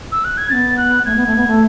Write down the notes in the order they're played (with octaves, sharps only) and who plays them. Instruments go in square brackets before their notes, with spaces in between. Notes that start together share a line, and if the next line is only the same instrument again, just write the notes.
[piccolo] E6
F#6
G#6
[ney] B3 C#4 [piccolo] A6
[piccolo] F#6
[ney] A3 [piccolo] G#6
[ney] B3
A3
B3
A3